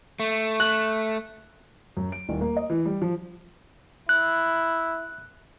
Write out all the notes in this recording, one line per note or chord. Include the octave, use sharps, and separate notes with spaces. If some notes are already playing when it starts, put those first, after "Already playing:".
A3
F#6
F#2
D7
D#1
A#3
D#5
E3
G3
F3
E4 F#6